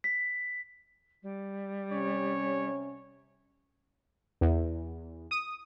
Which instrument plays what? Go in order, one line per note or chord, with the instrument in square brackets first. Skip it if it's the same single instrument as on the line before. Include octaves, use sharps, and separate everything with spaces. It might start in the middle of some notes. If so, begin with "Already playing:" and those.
[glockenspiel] B6
[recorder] G3
[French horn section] C3 C#4 [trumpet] C#5
[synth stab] E2
D#6